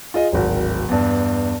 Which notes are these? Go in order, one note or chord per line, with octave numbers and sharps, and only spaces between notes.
F4 G#4 D#5
D1 G#1 A#4
E2 G2